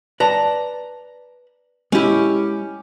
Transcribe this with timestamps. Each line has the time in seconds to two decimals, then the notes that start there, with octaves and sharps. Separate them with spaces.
0.20 B4 D5 A5 A#5
1.92 G#3 C#4 E4 G4